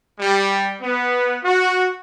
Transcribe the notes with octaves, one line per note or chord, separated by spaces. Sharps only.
G3
B3
F#4